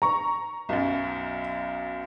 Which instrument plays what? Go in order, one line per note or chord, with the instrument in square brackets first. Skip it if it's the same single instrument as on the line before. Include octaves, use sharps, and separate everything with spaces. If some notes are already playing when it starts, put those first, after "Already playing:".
[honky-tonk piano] A#5 C#6
[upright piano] B1 F#2